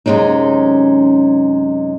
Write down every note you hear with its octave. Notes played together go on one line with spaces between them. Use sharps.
F#2 C3 G#3 C#4 D#4